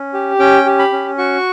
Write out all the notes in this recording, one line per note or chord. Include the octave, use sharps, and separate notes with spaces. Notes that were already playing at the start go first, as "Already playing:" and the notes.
Already playing: C#4
G4
C#4 G5
G4
B5
C#4
F#4 C#6